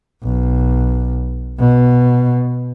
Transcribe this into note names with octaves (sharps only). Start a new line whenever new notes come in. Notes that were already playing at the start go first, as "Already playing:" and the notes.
B1
B2